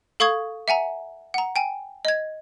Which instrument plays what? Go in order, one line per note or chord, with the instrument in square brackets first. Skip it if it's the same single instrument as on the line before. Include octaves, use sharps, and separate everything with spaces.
[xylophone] A4 F5 C#6 D#6 G#6
E5 F#5 G#5 A#5
F#5 A#5
G5 G#5
D#5 G#6